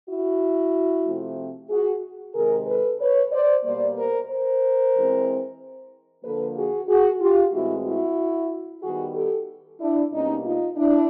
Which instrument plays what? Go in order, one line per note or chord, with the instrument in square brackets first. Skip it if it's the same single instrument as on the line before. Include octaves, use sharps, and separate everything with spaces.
[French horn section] E4 F#4
C3 F3 A3 C4
F#4 G#4
C3 D#3 G#3 G#4 A#4
A4 B4
B4 C#5
C5 D5
B2 G3 A#3 C5 D5
A#4 C5
A#4 C5
E3 G#3 C4
D3 F3 A#3 A4 B4
F#4 G#4
F#4 G#4
F4 G4
A2 E3 G#3 C4 E4 F#4
E4 F#4
D#3 G3 B3 F#4 G#4
G4 A4
D4 E4
B2 G3 A#3 C#4 D#4
D#4 F4
D4 E4